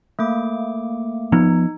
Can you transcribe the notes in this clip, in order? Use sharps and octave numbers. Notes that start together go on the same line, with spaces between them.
A3 A#3 D6
F3 B3 D#4